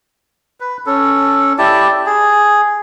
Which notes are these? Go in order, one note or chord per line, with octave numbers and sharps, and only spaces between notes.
B4
C#4 A4
E4 G4 D5 A5
G#4